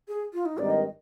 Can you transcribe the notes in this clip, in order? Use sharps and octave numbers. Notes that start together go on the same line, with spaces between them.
G#4
F4
D#4
G#1 G2 D#3 D5
D#5